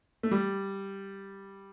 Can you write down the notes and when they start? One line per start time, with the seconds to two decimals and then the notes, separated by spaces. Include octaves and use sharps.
0.23 A3
0.31 G3